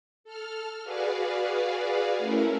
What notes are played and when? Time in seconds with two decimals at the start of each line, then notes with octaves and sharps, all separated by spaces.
0.24 A4 F6
0.83 F#4 G#4 B4 D5 F5
2.18 A3 C#4 E4 A#4